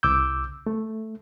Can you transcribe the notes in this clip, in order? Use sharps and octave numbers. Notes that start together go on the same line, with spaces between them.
C2 D6 E6 G6
A3